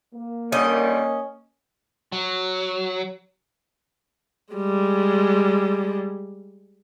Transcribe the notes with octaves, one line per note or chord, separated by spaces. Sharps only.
A#3
D3 D#3 G3 C#4 D#5
F#3
G3 G#3